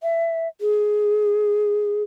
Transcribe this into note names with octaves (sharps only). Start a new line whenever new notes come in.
E5
G#4